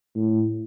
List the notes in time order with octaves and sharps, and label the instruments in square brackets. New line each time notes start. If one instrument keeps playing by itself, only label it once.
[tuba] A2